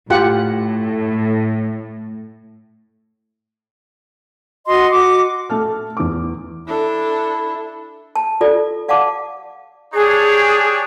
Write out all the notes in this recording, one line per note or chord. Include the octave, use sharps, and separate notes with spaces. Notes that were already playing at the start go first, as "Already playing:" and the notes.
A2 F4 G4 F#5
F#4 D#5 C6
F#4 D6
A3 A5 F6
E2 D6
D4 E4 A4
A5
F4 A4 D5
D5 F5 F#5 A5 D6
D4 G4 G#4 C#5